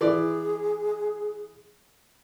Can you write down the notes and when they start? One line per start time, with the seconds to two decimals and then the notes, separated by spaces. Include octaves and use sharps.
0.01 E3 G#4 D5